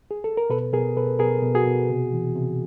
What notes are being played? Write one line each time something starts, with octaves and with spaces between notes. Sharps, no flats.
G#4
A4
A#4
B2 A4 B4
B2 G#4 A#4
B2 A4 B4
B2 G#4 A#4
B2
F#4 G#4
B2
C3
E3
C3